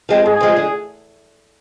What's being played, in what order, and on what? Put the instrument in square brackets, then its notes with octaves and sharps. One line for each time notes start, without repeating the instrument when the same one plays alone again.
[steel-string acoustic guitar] F3 G#3 C4
[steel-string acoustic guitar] G#2 [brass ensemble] G#4
[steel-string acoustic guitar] F3 G#3 C4
D3